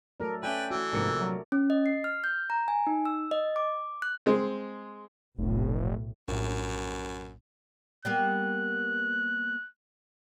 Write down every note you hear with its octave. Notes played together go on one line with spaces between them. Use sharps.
F#3 A3 A4 A#4 D5
A3 C#4 A4 B4 D5 E5 G5 G#5
E3 A3 F#4
A#1 G#2 C3 A3 A#4 D5 C#7
F#3
C#4
D#5
C7
F6
G6
A#5
G#5
D#4
E6
D#5
D6
F#6
G#3 C4
F1 B1 A2
A#1 F#2 A2
G3 A#3 B3 F#6